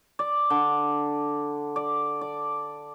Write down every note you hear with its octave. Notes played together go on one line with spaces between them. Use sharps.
D5
D3
D5
D5